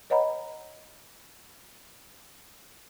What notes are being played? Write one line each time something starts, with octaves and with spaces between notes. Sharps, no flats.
B4 C#5 D#5 F#5 A#5 B5